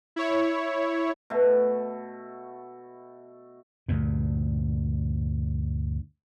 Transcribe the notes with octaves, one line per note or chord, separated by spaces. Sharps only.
E4 C#5
B2 A3
D2 G2 A#2